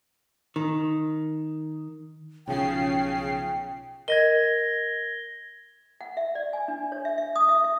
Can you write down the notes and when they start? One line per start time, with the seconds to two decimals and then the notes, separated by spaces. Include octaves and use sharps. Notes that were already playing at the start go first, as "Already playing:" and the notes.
0.56 D#3
2.47 B1 C#3 F3 G5 C7
4.08 A#4 D#5 G#6 A#6 G7
6.01 F#5
6.17 E5
6.35 D5
6.53 G#5
6.68 D4
6.92 C#5
7.05 E5
7.18 E5
7.36 D#6
7.49 E5
7.64 E5